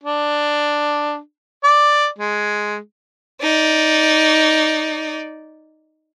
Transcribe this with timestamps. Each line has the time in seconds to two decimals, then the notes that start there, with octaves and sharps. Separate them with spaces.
0.04 D4
1.64 D5
2.18 G#3
3.42 D#4 D5